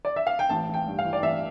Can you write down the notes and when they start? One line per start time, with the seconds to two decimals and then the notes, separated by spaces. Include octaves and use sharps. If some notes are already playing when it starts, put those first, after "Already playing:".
0.05 D5
0.16 E5
0.27 F5
0.39 G5
0.49 A1 A5
0.69 A1
0.74 G5
0.87 G2
0.99 F5
1.04 E3
1.13 D5
1.22 A1 E5